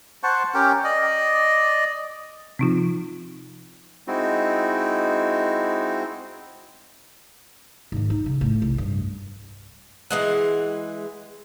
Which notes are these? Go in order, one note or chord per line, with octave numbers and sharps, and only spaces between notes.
C5 F#5 A5 C#6
C#4 G4 A#4 G5
D5 D#5
C3 F3 C4 D#4 F4
G#3 C4 D#4 E4 F#4
G#2 D#3
D#4
C#3
A2
C2
G2
E3 G#3 F#5